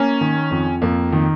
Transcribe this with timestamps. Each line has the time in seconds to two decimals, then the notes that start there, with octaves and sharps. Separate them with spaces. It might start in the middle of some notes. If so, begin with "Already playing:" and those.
Already playing: A#3 C#4
0.21 D#3
0.51 F2
0.82 F2 A#3
1.13 D#3